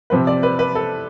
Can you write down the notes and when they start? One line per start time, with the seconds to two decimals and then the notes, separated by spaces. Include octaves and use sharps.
0.10 C3 F3 C4 B4
0.27 D5
0.43 B4
0.59 B4
0.75 A4